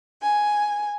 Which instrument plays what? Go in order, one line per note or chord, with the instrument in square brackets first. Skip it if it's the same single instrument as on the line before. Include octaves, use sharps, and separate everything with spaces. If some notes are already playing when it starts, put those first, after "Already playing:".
[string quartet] G#5